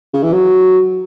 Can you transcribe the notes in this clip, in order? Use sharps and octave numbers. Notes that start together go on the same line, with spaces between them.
C#3
E3
F#3